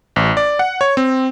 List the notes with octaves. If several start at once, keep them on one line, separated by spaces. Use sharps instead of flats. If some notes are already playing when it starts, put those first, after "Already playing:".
A1
D5
F#5
C#5
C4